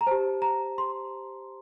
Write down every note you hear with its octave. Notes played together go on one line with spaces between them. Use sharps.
A#5
G4 C5 A5
A#5
C6